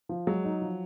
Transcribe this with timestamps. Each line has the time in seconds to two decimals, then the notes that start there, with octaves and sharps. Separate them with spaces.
0.09 F3
0.27 F#3 G#3
0.44 D#4
0.62 F3